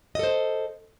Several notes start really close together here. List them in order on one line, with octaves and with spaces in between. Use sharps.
D#5 A4 C5